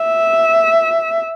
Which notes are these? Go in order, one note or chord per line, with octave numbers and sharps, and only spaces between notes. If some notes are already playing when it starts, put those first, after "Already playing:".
Already playing: E5